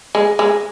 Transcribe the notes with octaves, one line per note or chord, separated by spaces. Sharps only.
G#3
G#3